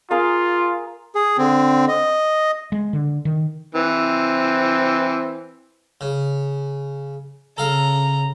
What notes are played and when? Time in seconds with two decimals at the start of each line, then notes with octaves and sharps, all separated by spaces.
0.11 F4 G#4 A#4 F5
1.15 G#4
1.38 D3 C4
1.88 D#5
2.72 G#3
2.93 D3
3.25 D#3
3.75 E3 C4
6.01 C#3
7.58 C#3 A4 F5 A#5